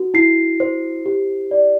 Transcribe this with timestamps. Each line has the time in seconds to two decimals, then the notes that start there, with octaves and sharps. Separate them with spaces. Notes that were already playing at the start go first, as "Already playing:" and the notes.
Already playing: F#4
0.14 E4 C7
0.60 C5
1.06 G4
1.51 D5